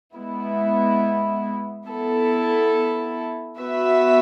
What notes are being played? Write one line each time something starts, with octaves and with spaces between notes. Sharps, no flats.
G#3 B3 E4
B3 E4 A4
B3 F#4 B4 E5